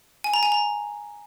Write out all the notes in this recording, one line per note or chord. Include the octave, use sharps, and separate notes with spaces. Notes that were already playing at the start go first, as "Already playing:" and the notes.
G#5
A#5
G#5
A#5